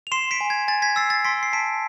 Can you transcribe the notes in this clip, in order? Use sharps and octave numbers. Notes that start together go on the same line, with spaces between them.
F7
C6 C7 E7
B6 D7
G#5
G#6
G#5 A6
G#6 B6
E6 A6 C7
A6 C7
C6 B6 D7
C7
A5 B6 D7